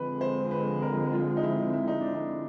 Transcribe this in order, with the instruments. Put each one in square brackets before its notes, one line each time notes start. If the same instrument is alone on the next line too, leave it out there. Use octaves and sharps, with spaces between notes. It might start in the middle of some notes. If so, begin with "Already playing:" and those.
Already playing: [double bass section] D3 F3 G#3 C4 [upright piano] B4
[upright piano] C5
B4
A#4
F4
D#4
E4
E4
D#4
D4
D#4